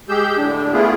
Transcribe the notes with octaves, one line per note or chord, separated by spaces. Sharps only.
G#3 G4 G#4 E6 G6
A2 D3 D4
A3 B3 E4 F4 G#4